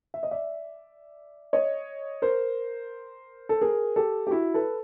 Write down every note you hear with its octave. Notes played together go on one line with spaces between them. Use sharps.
E5
D#5
D5 E5
C#5 D#5
A#4 C5
A4
G#4 A#4
G4 A4
G4
E4 F#4
A4 B4